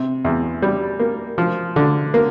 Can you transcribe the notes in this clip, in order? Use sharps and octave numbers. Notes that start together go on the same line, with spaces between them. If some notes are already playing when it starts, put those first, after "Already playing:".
Already playing: C3
E2
G3
A#3
F3
D3
A#3